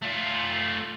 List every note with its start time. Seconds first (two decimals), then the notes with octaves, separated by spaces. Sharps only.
0.02 A3 F4